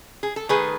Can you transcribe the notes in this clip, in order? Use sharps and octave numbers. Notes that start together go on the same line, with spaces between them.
G#4
A4
D#3 A3 G#4 B4